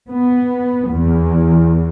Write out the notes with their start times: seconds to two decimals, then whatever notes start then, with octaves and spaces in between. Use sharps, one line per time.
0.10 B3
0.91 E2